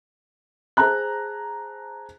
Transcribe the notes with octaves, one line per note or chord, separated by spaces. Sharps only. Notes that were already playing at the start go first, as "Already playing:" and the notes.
G#4 C5 A5 A#5 F#6